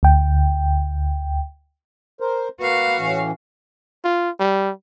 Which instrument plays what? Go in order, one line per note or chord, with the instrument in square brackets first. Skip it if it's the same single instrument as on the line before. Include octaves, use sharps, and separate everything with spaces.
[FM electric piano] D2 G5
[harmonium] A#4 C5
[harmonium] A#3 B4 [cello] F#4 F5
[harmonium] A2 E3 C#4
[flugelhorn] F4
G3